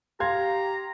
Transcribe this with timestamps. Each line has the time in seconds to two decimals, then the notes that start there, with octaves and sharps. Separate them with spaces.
0.20 G4 F5 A#5 C6 G#6